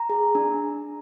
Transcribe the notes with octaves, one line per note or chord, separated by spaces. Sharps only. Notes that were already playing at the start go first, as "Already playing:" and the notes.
Already playing: A#5
G#4
D4